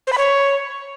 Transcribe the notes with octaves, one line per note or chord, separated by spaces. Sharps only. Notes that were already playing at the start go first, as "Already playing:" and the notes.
C5
B5
C#5